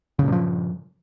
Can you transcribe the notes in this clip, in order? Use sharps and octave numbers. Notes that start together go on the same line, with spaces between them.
G2 A#2 C#3 F3